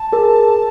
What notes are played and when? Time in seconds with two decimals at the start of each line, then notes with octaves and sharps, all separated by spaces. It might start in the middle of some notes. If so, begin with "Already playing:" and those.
Already playing: A5
0.12 G#4 A#4